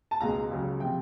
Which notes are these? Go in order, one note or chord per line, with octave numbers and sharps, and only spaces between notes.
A5
C#2 B2 G#3 A#5
C#2 C#3 F#3
C3 F3 G5